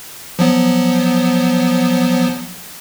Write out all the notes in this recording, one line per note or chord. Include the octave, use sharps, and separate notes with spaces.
F3 F#3 B3